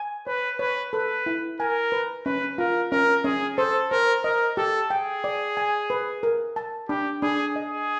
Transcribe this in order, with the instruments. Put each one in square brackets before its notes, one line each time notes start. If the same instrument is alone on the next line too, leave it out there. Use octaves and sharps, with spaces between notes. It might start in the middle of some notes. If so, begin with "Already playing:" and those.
Already playing: [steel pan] G#5
[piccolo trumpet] B4 [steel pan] C#5
[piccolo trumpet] B4 [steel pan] C#5
[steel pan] A4 [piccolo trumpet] B4
[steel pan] E4
[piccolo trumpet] A#4 [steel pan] G#5
[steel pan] B4
[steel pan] C#4 [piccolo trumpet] B4
[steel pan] F4 [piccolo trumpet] A#4
[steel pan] C#4 [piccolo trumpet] A#4
[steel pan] C#4 [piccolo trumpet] G#4
[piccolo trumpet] A4 [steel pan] C5
[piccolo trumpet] A#4 [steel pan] C5
[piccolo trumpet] A#4 [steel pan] D#5
[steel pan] G4 [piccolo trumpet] A4
[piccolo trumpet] G#4 [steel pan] G5
[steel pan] D5
G#5
B4
A#4
A5
[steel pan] D4 [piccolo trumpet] G4
[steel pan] D4 [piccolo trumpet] G#4
[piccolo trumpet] G#4 [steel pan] D#5